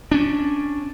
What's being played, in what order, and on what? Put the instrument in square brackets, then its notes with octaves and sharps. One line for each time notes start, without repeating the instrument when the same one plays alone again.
[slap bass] C#4 D4